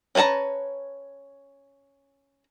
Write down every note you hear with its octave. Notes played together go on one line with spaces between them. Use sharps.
C#4 B4 C5 A5 A#5